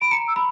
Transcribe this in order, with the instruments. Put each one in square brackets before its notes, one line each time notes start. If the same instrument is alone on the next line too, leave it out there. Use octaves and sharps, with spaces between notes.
[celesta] B5 [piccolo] D7
[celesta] A#5 [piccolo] C#7
[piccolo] E6
[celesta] B5